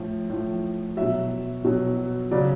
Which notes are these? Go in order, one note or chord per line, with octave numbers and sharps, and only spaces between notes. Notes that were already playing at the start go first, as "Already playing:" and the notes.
Already playing: A2 F3
A2 F3
B2 F#3 E5
B2 F#3
C#3 F#3 D5